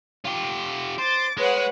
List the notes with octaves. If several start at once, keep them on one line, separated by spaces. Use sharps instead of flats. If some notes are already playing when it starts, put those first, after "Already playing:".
F4 G4
C5 D6 A6
G#3 B4 C#5 F#5